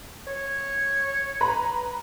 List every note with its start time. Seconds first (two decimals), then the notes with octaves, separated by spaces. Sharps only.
0.27 C#5
1.41 B4 A#5 B5